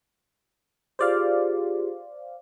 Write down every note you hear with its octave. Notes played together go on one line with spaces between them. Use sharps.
F4 G4 G#4 C5 D5 F5